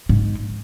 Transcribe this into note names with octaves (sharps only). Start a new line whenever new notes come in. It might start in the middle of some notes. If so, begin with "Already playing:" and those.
G#2